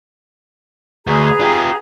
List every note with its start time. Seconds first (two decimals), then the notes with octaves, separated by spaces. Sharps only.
1.07 D2 G#4 B4 A#5
1.41 F4 G4